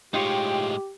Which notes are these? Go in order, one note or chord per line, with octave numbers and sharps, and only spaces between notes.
A2 G#3 D#4 F4 G4 C#5 G5